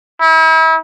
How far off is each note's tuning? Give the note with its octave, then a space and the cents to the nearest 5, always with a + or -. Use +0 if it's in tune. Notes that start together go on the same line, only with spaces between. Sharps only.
E4 -40